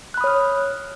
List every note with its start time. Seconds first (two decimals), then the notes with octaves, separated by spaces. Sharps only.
0.14 F#6
0.17 B5
0.21 D#6
0.24 C#5
0.27 F6